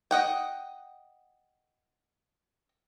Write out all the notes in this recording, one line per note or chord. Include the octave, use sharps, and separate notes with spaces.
D#5 F#5 G5